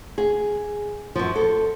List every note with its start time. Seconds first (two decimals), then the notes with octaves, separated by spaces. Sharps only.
0.18 G#4
1.15 F#2 F3
1.36 A4